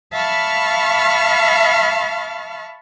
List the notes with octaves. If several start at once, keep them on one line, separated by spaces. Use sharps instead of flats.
E5 F5 A5 B5 C#6 F6